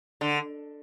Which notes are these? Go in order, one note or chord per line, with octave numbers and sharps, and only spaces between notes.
D3